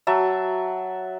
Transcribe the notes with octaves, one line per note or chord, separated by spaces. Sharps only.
F#3 E5 A5